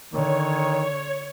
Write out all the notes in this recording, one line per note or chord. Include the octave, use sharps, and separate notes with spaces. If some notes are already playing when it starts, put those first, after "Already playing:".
D3 D#3 C#5